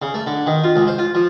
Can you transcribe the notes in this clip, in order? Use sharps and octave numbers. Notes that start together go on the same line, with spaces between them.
C#3
A3
D3
D#3
F4
C#2
C5
F4
F3